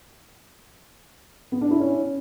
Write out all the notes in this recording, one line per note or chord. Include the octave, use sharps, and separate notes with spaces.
B3
D4
E4
C#4